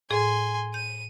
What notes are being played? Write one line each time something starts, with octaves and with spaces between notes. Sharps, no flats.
A2 G#4 G#5 C6
G6 D#7